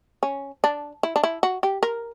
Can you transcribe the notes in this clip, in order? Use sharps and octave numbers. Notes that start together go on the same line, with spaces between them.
C#4
D4
E4
D4
E4
F#4
G4
A#4